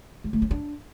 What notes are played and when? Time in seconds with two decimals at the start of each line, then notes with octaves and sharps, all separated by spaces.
0.24 G#3
0.33 A3
0.42 C#4
0.51 D4